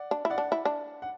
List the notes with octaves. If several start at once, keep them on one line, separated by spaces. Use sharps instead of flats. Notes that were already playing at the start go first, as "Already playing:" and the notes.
Already playing: D5 F#5
D4
E4
D5 F#5
D4
E4
D4
F#5